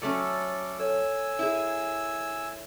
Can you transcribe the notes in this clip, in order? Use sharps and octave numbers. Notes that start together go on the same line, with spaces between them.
F#3 A3 C#4 A4 D5
A4 C#5 G#5 E6
E4 G#4